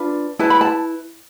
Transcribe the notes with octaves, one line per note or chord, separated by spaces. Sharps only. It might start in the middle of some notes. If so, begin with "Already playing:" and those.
Already playing: D4 F4 B4
E4 B4 A5
B5
A5